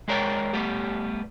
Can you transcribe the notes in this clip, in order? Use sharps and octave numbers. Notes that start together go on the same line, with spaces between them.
G#3 G#4 A#4 C#5 D5 G5
G3 A3 B3 G4